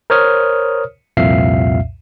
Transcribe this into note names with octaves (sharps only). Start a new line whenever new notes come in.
A#4 C5 C#5 D#6 F6
C2 F2 A#2 E5 F5 C7